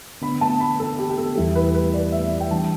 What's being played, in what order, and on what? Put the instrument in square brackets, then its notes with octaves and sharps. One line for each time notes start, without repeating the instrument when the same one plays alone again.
[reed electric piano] D3 B3 D4 [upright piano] B5
[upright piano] A5
B5
A4
G4
G4
A4
[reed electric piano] E2 E3 G3 E4 G4 [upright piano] A4
[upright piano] B4
B4
D5
E5
G5
[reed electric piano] E3 G3 D4 G4 [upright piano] A5